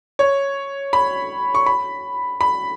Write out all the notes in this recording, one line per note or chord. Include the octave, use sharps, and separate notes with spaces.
C#5
B5
C#6
B5
B5